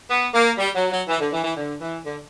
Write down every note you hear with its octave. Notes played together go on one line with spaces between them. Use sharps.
B3
A#3
G3
F#3
F#3
E3
D3
E3
E3
D3
E3
D3